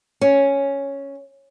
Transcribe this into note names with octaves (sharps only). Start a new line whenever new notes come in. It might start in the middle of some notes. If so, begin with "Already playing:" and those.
C#4